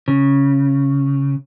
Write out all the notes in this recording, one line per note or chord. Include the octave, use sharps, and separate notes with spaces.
C#3